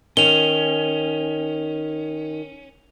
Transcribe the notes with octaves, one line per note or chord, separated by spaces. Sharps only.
D#3 C#4 F7 G7